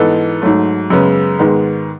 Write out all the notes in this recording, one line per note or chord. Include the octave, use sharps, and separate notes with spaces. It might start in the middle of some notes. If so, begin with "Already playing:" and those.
Already playing: G#2 E3 B3 D#4 A4
G#2 F#3 A3
F#2 C#3 G#3 B3
G#2 D#3 G#3 B3